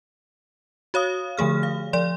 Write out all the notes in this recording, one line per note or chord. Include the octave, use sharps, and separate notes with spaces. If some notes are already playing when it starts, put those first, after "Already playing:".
F#4 C#5 F5 D#6
D3 F3 A3 G#4 F6
F5
F3 D5 C6